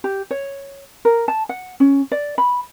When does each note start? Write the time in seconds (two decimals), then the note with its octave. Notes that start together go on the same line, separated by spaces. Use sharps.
0.04 G4
0.31 C#5
1.05 A#4
1.28 A5
1.49 F#5
1.80 C#4
2.12 D5
2.38 B5